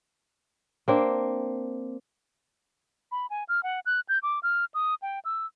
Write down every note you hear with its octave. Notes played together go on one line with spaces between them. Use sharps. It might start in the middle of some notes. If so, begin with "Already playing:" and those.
A#3 C4 D4
B5
G#5
F6
F#5
F#6
G6
D6
F6
D#6
G5
E6